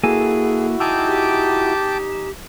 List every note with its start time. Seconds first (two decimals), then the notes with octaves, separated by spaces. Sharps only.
0.04 A#3 E4 F#4 G#4 A4 G#5
0.80 D#4 G#4 G5 A5 D6 E6
1.08 G4